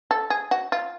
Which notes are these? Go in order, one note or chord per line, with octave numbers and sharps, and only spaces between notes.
A4
G#4
F#4
F4